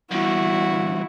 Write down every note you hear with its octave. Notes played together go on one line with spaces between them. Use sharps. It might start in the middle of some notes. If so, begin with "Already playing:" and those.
E2 G2 E4 F#4